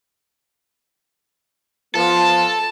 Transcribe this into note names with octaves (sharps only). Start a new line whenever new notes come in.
F3 B3 F4 A4 A5